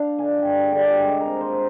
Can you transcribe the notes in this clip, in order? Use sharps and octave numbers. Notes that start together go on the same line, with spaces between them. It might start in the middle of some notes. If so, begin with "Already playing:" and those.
Already playing: D4 F5
D3 G#5
G5
G3
G#4
D3
G4
G#3 G#4
A#4
C4
C5
C4